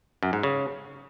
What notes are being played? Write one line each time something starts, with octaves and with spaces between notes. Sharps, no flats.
F#2
G#2
C#3